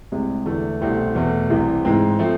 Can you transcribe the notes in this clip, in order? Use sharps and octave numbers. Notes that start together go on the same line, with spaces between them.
C2 C3 G#3
E2 D3 A3 E4
C2 B2 A3 C4 E4
E2 B2 A3
C2 C3 E3
G#2 E3 G#3 C4
F3 A3 C4